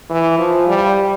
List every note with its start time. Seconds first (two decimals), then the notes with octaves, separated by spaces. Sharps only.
0.10 E3
0.39 F3
0.68 G3